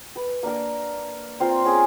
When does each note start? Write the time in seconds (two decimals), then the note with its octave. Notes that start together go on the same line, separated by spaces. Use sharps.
0.16 B4
0.43 A#3 D4 A#4
1.40 C4 F4 A#4
1.65 C#4 G#4 A#4 F5